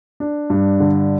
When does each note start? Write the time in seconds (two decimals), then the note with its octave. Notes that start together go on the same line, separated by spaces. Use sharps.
0.20 D4
0.50 G2
0.80 D3